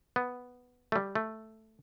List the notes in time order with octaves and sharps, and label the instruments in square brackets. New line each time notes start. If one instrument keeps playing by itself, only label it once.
[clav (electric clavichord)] B3
A3
G3
A3